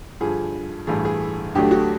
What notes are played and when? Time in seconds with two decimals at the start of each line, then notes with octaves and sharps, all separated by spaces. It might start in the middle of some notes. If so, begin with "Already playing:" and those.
0.20 G2 D3 F3 G#4
0.87 A1 G2 E3 A3 G#4
1.05 G#4
1.55 D2 D3 F#3 A3 G4
1.71 F#4